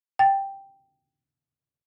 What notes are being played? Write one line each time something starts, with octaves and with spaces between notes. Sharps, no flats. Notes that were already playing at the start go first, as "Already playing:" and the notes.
G5 A6